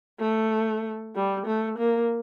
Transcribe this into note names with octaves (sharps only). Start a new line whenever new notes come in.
A3
G3
A3
A#3